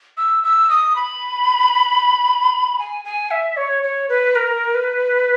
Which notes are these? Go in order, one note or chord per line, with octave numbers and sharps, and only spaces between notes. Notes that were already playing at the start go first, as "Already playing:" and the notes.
E6
E6
D#6
B5
G#5
G#5
E5
C#5
C#5
B4
A#4
B4